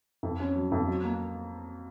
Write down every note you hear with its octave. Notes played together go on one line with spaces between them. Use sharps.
F2
C#4
F#3
F2
F#3
A#3